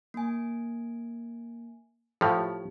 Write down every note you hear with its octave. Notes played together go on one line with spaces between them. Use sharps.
A#3 G#5
A2 F3 G4